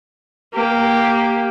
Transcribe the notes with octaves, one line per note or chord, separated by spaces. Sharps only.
A#3 G4